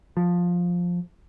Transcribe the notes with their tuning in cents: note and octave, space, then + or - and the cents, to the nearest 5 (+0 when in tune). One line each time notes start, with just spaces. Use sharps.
F3 +10